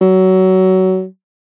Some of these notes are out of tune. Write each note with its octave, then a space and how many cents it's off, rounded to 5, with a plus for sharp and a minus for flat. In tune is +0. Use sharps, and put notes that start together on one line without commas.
F#3 +20